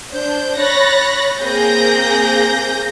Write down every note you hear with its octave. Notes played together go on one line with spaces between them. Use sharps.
D4 C5 G6
C#5 B5 F#6 A6 A#6
A#3 C4 G#4 G6 A#6